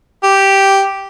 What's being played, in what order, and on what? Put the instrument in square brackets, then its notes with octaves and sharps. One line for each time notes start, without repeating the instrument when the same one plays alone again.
[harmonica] G4